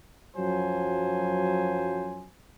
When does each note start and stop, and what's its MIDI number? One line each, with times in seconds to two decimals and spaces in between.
0.37 2.27 42
0.37 2.27 53
0.37 2.27 54
0.37 2.27 72
0.37 2.27 80